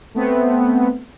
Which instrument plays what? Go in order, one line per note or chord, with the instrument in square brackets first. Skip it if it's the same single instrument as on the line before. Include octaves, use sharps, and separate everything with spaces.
[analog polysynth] A3 B3 C4